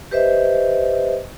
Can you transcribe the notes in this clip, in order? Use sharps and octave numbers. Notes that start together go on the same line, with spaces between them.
G4 B4 C5 D#5 E5